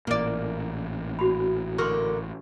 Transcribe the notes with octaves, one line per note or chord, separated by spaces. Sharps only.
A1 A#2 A#3 D5
F#4 B5
D3 A#3 A#4 C6 C#6